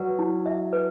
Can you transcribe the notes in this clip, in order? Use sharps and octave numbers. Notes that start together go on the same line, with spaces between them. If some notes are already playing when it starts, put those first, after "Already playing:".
Already playing: F#3 B4 D5
E4
E5
B4